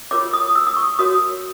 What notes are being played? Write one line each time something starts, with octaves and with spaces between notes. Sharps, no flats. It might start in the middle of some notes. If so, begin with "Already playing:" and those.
F4 A#4 C#5 D6
D#6
E6
D#6
C#6
F#4 A#4 C#5 D#6